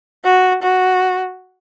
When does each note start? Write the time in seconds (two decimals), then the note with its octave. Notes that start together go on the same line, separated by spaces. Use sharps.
0.24 F#4
0.62 F#4